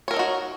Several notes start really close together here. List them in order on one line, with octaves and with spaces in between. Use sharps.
C#5 A#4 A4 D#4 F#4